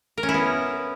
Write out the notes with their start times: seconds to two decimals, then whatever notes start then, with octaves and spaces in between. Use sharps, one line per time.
0.17 A#4
0.23 C#4
0.29 E4
0.34 B3